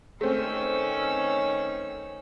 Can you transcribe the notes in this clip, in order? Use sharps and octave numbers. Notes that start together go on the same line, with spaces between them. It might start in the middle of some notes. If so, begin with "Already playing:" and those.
D#3 A3 C4 C#4 E6